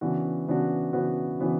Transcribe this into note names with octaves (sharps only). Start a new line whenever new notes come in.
C#3 E3 B3 D4 F#4
C#3 E3 B3 D4 F#4
C#3 E3 B3 D4 F#4
C#3 E3 B3 D4 F#4